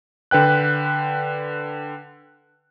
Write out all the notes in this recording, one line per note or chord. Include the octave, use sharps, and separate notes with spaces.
D3 B4 G5 F#6